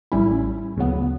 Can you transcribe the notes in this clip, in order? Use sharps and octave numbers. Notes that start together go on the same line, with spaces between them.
A1 A2 G3 C#4 E4
D2 C#3 F#3 B3